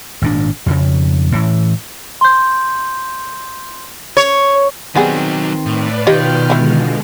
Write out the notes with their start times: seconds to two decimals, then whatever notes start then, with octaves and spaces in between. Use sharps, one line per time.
0.22 G#1 A#2 D4
0.66 F2 C#3
1.32 A2 E3
2.21 C6 G6
4.17 C#5
4.95 D#3 F#3 G3 B3 C4 D#4 G#4
5.66 A2 B4 D5
6.07 B2 D#3 F4 G4 C#5 D#5 G5 F6
6.50 B2 D3 E3 G#3 E4